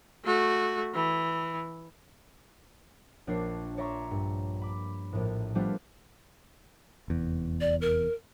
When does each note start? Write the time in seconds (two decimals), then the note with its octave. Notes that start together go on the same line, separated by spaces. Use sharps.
0.24 A3 F#4
0.94 E3
3.27 A#1 D4 C#5 C7
3.77 C#5 D5 E5 A#5 C6 C#6
4.11 G2
4.61 B5 D6
5.12 A#1 A2
5.55 F3 G3 A3 B3 D4 F4
7.08 F1 E2
7.61 D5
7.81 A#4